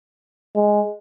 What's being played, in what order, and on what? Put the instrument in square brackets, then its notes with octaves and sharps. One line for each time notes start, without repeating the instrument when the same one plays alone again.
[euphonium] G#3